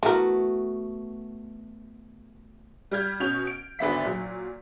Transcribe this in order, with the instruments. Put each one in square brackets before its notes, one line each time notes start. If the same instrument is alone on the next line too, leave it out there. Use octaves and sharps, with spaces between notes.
[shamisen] E3 A#4 [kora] A3 B3 F#4
[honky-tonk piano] G3 F6 G6 G#6
B2 C#4 G6 F7
D7
G#1 D3 B3 E5 B6
A#2 F#3